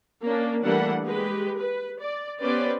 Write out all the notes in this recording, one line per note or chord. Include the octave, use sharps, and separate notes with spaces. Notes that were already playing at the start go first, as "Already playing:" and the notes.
A#3 C#4 D4
E3 G3 A3 A#3 D4 F#5
G#3 G4 B4
B4
D5
B3 C#4 G4 B4 C5 D5